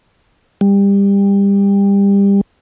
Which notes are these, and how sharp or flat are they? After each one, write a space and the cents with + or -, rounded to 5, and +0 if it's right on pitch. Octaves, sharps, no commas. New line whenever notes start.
G3 +25